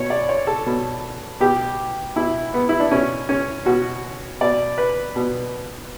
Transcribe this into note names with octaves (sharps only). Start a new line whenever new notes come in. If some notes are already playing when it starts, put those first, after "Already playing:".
Already playing: B2 C#5
D5
C#5
A4
B2
B2 G4
B2 E4
B3
E4
D4
B2 C#4
C#4
B2 F#4
B2 D5
B4
B2